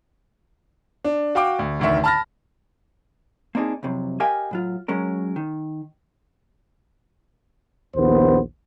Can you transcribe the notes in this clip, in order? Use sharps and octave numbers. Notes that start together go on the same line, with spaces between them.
D4
F#4 F5 G5 D6
D2
F1 D2 D#3 E5 C#6
A5 B5 F6 A6 A#6
A#3 C4 D4 D#4 G#4
C2 F2 C3 F#3
G4 A#4 D#5 F5 G5 G#5
A2 F#3 F4
F#3 G#3 C#4 A#4
D#3
A#1 D#2 B3 C5